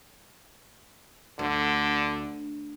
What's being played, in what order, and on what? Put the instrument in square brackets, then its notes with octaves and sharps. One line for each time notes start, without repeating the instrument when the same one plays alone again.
[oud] D2 [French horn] D3